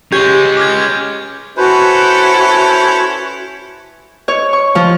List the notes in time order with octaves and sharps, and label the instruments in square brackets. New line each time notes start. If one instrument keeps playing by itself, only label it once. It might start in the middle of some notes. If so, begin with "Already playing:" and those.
[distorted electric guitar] G#3 C#4 [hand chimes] G4 [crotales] G6 G#6
[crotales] D6 F6 G#6
[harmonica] C#4 E4 A4 [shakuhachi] F#4 [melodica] B4 C5
[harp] C#5
C#6
F3